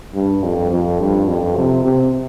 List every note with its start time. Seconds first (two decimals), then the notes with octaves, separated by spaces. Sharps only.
0.15 G2
0.43 F2
0.71 F2
1.00 G2
1.28 F2
1.56 C3
1.85 C3